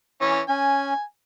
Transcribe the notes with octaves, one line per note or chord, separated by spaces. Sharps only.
E3 C#4 C#5
C#4 G#5